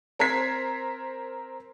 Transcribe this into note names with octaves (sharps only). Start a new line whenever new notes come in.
C4 A#4 C5 G#6 B6 C7